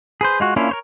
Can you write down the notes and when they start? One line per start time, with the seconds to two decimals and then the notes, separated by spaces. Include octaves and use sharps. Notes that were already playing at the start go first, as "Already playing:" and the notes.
0.21 G#4 B4 C5
0.40 G#3 F4 F#4
0.56 A#3 C#4 D4 E4 F4
0.69 A#4 C5 C#5